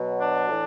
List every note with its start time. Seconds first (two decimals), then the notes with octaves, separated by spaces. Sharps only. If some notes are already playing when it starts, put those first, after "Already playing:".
Already playing: B2 F#3
0.19 D4
0.49 A2 E3